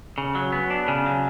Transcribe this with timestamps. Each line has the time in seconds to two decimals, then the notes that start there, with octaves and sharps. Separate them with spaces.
0.18 C#3
0.35 F#3
0.52 B3
0.70 D4
0.88 C#3
1.06 F#3